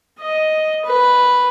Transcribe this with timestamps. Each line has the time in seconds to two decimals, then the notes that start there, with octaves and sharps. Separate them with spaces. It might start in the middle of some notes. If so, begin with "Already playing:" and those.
0.20 D#5
0.85 B4